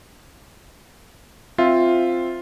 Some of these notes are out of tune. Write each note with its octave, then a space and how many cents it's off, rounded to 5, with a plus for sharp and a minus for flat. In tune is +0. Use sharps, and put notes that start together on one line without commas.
C4 +0 F4 +0 E5 +0